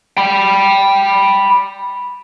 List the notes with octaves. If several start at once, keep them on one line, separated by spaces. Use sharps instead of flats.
G5 B5